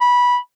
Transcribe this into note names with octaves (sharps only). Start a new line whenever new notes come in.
B5